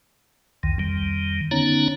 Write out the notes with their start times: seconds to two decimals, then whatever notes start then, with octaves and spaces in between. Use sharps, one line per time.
0.63 C2 F2 D#3
0.79 F2 D#3 G3
1.51 D3 B3 C#4 D#4 C#5 A#5